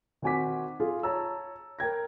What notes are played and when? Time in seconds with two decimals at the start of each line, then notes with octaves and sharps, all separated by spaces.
0.22 D#3 C4 F#4 G#5 D6 B6
0.80 F4 G#4
1.03 C#5 A5 A#5 E6
1.79 A#4 G5 G#6 A#6